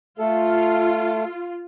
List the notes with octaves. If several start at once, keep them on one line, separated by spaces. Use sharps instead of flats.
A3 F4 A4